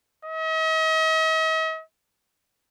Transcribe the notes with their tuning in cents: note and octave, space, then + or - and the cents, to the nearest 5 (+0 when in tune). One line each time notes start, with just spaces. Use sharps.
D#5 +45